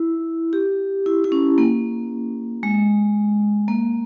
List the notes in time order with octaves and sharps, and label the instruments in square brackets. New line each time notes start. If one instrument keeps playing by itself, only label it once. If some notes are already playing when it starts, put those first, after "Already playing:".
Already playing: [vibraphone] E4
G4
E4
E4
C#4
A#3
G#3
A#3